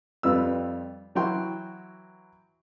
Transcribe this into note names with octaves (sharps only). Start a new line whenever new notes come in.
F2 G3 F4 B4 E6
E3 F#3 E4 F#4 G5 C6